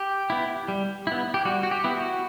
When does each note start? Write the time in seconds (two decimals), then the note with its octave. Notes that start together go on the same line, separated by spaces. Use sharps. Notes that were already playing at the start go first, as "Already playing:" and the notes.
Already playing: G4
0.30 B3 E4
0.68 G3
1.07 B3 E4
1.34 G4
1.45 G3 F#4
1.63 F#4
1.71 G4
1.84 B3 E4
1.97 F#4